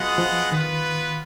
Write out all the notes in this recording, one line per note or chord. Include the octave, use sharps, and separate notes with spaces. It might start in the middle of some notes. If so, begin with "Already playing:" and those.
Already playing: F#3 B3 F4 G#4 D#5 F#5
F3
D#3 B3 F4 B4